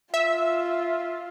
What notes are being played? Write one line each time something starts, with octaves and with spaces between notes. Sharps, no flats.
F4 E5